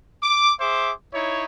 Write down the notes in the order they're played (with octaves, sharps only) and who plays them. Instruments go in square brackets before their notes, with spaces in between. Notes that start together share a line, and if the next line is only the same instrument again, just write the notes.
[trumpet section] D6
G#4 C5 E5 D6
D#4 E4 C#5